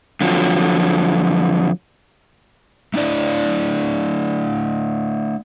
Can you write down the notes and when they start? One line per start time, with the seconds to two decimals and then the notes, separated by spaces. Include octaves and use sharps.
0.21 F2 D3 F3 F#3
2.94 A3 D4 E4 D5